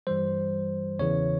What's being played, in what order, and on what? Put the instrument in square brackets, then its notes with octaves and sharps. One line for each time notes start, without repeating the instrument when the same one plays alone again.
[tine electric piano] G2 E3 G3 C5
E2 C#3 E3 C#5